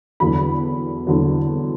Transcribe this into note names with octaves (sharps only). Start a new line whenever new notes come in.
E2 D3 F#3 B5
E2 D3 F#3